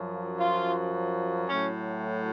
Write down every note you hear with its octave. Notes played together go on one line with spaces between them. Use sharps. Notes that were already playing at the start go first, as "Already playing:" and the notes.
Already playing: F#2 F3
F4
A2 F#3 C#4